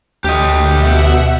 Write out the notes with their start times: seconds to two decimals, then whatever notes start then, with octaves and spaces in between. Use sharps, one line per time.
0.24 D2 G4 D#5
0.66 B2 E5 F#5